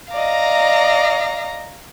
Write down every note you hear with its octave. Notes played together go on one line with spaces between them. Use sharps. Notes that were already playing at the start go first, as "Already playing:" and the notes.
D5 D#5 F5 A#5